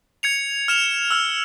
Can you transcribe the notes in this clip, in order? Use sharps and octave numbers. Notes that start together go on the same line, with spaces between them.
G#6 C#7 F7
F6 E7 F7
E6 F6